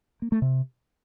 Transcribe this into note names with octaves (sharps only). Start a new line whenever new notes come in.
A#3
A3
C3